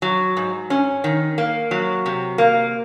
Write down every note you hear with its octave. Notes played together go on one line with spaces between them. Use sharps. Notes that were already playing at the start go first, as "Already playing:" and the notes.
F#3
G#2
C#4
D#3
A#3
F#3
C3
A#3